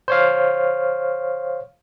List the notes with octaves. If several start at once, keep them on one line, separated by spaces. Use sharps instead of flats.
C5 C#5 F5